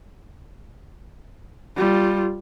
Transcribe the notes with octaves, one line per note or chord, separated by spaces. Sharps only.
G3 F4